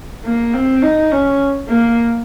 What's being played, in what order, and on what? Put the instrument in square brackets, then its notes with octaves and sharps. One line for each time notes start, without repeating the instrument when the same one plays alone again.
[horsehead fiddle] A#3
C4
D#4
C#4
A#3